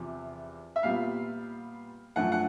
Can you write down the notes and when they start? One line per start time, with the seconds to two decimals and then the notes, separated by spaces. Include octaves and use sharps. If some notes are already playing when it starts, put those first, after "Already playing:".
Already playing: E2 C3 F3
0.76 E5
0.83 A#2 G3 B3 F5
2.16 F#2 D3 F3 A3 F#5
2.32 F#5